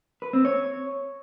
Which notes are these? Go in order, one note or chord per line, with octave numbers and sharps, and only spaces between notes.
B4
C4
C#5